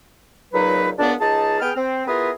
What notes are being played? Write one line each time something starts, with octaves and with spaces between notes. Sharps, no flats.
C#2 A#2 F#3 D#4 B4
C#2 A#2 B3 D4
C#2 D#4 G#4 A5
B3 G#4 G5 F6
C4
B3 E4 F4 G#4 A#4 B4